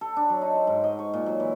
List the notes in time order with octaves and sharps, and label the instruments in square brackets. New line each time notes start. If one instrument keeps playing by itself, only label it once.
[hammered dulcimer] A4
D4
F#3
D#4
C5
G#2
D#5
C#6
A#2
F#3
E3